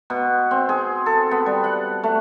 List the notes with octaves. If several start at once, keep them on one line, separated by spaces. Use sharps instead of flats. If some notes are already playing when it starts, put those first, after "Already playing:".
B2
C4
G#4
A4
B3
G3
F#5
A3